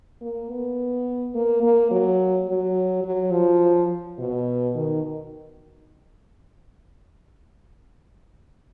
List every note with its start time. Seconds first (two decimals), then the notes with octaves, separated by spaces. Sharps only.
0.21 A#3
0.50 B3
1.35 A#3
1.63 A#3
1.91 F#3
2.48 F#3
3.04 F#3
3.32 F3
4.19 B2
4.75 D#3